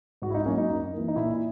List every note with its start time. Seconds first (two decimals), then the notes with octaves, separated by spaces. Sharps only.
0.22 G#2 F#4
0.30 E4
0.34 D#4
0.45 A#3 C#4
0.49 F#3
0.58 D#4
0.69 F#2
0.94 E3 A#3
1.08 D#4
1.16 A#2 E4